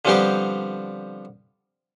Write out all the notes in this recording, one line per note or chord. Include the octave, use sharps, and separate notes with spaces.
D3 F3 G3 B3 C4 G4